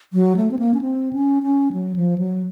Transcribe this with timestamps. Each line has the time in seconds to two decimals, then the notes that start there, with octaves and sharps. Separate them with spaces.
0.13 F#3
0.36 A3
0.51 C4
0.59 A#3
0.74 C#4
0.81 C4
1.13 C#4
1.43 C#4
1.73 F#3
1.96 F3
2.18 F#3